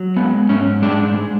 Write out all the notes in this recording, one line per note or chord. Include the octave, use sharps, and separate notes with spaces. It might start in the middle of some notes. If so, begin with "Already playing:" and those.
Already playing: F#3
G#3 B3
G#2 C#4
G#3 D4
G#3